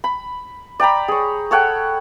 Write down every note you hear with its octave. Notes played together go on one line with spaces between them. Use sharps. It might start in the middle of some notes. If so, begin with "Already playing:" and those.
B5
D5 G5 A#5 B5
G#4 C#5
A4 C#5 F#5 G5